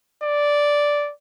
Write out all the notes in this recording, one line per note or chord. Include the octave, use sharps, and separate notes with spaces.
D5